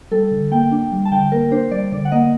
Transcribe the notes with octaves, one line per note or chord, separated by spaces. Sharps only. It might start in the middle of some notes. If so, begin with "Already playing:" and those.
G3 A4
D3
A#3 G5
D4
G3
A5
D3 G5
A#3 A#4
D4 C5
G3 D5
D3 D5
F#5
A#3 D#5